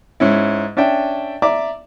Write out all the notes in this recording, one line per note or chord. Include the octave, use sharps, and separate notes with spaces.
G#2 C#4 E4
C#4 D4 E5 G5
D5 E5 A#5 D6